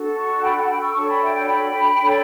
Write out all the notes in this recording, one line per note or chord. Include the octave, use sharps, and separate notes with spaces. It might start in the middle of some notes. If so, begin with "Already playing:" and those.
Already playing: D4 F#4 A4
A5 C#6
G5 B5
F#5 A5
G5 B5
C#6 E6
D4 F#4 A4 C#5 A5 C#6
G5 B5
E5 G5
G5 B5
G5 B5
D4 A4 C#5